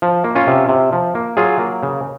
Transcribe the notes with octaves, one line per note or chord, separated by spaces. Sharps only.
F3
A#3
C#4 F4
C3
C3
F3
A#3
F#3 F4 G#4
A#3
C#3